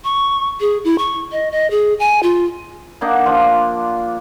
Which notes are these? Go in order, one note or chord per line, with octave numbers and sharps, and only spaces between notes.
C#6
G#4
E4
C#6
D#5
D#5
G#4
G#5
F4
A#3 D4 D#4 F#5
F3 D4 F4